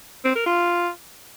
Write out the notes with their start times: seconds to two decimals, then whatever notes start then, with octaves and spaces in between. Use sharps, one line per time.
0.25 C4
0.35 A#4
0.46 F4